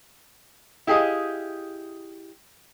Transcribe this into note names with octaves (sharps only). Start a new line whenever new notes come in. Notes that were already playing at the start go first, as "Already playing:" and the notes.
E4 G4 G#4 D#5 F5